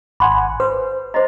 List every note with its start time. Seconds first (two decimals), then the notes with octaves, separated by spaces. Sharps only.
0.20 G#1 F#5 G#5 B5 C6
0.60 B4 C5
1.14 C5 D#5 A#5 C6